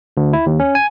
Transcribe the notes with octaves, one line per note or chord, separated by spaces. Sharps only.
D2
E4
D#2
C#4
G#5